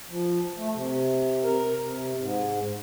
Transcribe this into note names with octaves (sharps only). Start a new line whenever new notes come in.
F3
A3
C3
A#4
C3
G#2